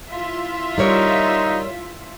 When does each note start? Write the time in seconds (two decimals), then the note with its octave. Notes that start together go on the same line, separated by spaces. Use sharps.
0.11 E4 F4 E5
0.78 G3 D#4 A#4 C#5